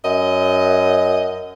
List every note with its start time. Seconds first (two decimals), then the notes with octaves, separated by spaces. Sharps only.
0.04 F#2 D#5